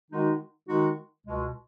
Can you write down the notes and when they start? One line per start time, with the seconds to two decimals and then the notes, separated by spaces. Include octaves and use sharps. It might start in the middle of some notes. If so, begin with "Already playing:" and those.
0.10 D#3 G#3 D#4 F#4
0.67 D#3 G#3 D#4 F#4
1.24 C#2 B2 G#3